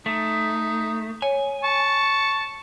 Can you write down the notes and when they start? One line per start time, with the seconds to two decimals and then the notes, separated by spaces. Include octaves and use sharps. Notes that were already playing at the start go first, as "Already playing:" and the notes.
0.06 A3 D#4
1.22 C#5 G#5
1.64 A5 C#6